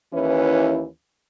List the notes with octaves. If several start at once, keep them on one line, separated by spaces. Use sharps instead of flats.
D#2 E3 C#4 E4 B4